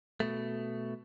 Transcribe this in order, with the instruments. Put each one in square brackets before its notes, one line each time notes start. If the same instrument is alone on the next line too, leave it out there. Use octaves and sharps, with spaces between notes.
[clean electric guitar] B2 A3